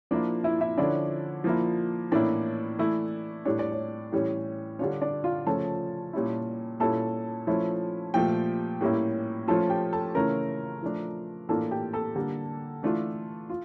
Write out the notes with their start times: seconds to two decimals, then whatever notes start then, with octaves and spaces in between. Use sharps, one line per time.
0.11 F3 A#3 D4 E4 D5
0.44 E4 E5
0.61 E4 E5
0.78 D3 F3 C#4 D4 E4 D5
1.44 F3 A#3 E4
2.12 A2 E3 A#3 C#4 D4 E4 D5
2.79 E3 A3 E4
3.45 A2 G3 D4 C#5
3.59 D5
3.72 C#5
4.12 A2 E3 G3 C#4
4.79 D3 G3 D4 F4 C#5
5.01 D4 D5
5.24 F4 F5
5.46 C#3 F3 A3 C#4 A4 A5
6.13 A#2 G3 C#4 E4
6.80 A#2 G3 C#4 E4 A4 A5
7.47 F3 A3 C#4 E4
8.14 A#2 F3 A3 G4 G5
8.81 A2 G3 A#3 C#4 E4
9.48 F3 A3 C#4 F4 A4 A5
9.70 G4 G5
9.93 A4 A5
10.15 C#3 E3 A3 C#4 F4 A#4 A#5
10.82 F3 A3 D4
11.49 A2 E3 A#3 D4 F4 A4 A5
11.71 G4 G5
11.93 A4 A5
12.16 D3 G3 A#3
12.83 E3 A3 D4 F4
13.50 F4